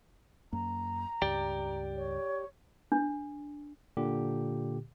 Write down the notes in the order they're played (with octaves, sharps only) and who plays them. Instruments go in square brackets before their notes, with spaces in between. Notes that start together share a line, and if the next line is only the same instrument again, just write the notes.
[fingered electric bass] F#2 A#3 [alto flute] A#5
[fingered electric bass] C#2 G2 [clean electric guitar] G4 D5 G5
[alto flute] C#5
[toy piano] D4
[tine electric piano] A#2 D3 G4